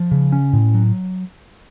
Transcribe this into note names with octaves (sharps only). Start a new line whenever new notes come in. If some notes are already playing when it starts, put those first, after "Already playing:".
Already playing: F3
C#3
C#4
A2
F#3